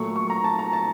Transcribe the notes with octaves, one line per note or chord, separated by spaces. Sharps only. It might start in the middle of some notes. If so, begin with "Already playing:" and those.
Already playing: A#2 F#3 A3 C#6
C#6
A#5
A5
A#5
A5